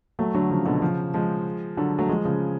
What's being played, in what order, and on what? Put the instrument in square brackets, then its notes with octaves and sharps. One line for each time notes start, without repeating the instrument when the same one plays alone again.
[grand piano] F#3 A3
D3 F#3
C#3 F3
B2 D3
C#3 F3
F3 G#3
D3 F#3
F#3 A3
F3 G#3
C#3 F3